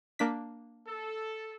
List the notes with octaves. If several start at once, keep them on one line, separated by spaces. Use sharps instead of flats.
A#3 D4 B6
A4